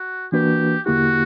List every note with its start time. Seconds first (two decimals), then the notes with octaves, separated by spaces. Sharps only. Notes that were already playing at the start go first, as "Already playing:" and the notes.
Already playing: F#4
0.32 E3 A#3 D4 F#4 G4 B4
0.86 E2 D3 A#3 E4 F#4 G4